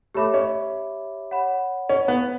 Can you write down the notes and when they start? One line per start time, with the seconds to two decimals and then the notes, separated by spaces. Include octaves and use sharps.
0.14 A3 G4 C#5 E5 B5 D6
0.34 C#4
1.31 C#5 F#5 B5
1.89 C#4
2.08 B3